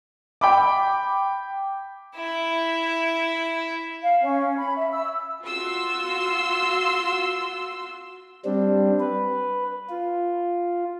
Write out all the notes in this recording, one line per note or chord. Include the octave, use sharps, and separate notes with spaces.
G5 B5 D6
E4 E5
F5
C#4
B5
E5
E6
F4 F#4 C6 E6
G3 C4 D4
B4
F4